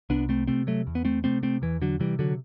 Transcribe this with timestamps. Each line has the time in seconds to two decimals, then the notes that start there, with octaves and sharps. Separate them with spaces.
0.10 C2 B3 D4
0.29 A3 C4
0.47 C3 A3 C4
0.67 F#3 A3
0.87 E2
0.95 B3
1.05 A3 C4
1.24 C3 A3 C4
1.43 A3 C4
1.62 E2 E3
1.82 D3 F#3
2.00 C3 E3 G3
2.19 D3 F#3